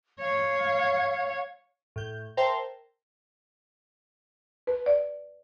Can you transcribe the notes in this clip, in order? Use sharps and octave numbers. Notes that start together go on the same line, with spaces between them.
C#5 F5
A2 G6
A#4 C5 E5 G5 A5 C6
B4
D5